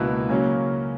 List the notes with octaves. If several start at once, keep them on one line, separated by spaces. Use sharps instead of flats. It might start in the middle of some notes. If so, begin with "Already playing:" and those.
Already playing: C#2 B2 A#3 E4 B4
C#3 F#3 A#3 C#4